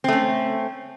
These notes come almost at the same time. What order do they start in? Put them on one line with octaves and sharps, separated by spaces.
C4 A3 C#4